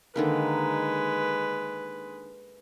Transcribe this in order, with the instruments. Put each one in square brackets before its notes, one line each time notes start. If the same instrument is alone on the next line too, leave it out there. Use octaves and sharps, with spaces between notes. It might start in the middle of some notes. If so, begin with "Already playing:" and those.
[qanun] D3 D#3 A#3 [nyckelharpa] G#3 B4